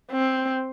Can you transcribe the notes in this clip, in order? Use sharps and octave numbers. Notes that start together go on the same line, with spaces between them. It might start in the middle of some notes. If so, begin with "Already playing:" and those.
C4